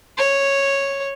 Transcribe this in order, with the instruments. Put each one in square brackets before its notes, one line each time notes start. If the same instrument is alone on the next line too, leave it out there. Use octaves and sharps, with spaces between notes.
[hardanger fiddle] C#5